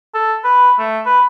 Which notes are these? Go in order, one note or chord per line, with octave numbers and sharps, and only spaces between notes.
A4
B4
A3
B4